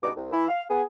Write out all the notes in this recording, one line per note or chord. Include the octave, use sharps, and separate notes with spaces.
C#2 G2 B2 D#4 D6
C2
E3 E4
F5
B3 G#4